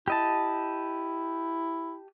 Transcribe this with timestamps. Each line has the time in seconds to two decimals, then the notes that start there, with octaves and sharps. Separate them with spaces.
0.08 E4 G4 D#5 A5